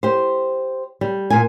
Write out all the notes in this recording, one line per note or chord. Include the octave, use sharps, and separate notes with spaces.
G4 C5
G3
A#2 G#5